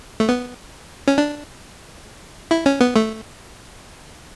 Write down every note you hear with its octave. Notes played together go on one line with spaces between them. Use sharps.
A3
B3
C#4
D4
E4
C#4
B3
A3